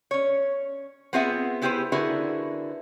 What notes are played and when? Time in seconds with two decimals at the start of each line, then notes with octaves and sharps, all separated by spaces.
0.11 C#4 C#5
1.13 B3 C4 F4 G#4 E5 F#5
1.62 B3 E4 G4 G#4 B4 C5
1.92 D3 E4 F#4 G#4 A#4 B4